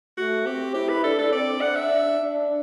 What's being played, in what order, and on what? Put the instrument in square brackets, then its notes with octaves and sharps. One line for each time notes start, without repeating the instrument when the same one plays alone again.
[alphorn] A3 [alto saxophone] F#4
[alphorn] C4 [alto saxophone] G4
[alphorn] E4 [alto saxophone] G4
[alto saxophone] B4
[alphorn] D4 [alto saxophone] A4
[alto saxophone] A4
[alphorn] C4 [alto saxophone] D5
[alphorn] D4 [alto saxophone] F#5
[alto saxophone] E5
[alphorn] D4
D4